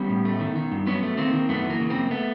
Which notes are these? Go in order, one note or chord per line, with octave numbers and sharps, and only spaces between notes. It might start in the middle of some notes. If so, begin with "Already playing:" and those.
Already playing: G3 B3 C#4
A2
A3
D#3
D#3
G2
F#3 B3 C#4
A3
D#3 A#3 C4
D#3
F#2 A3 B3
E3
A#3
C#3
A#3 C4
F#2
A3 B3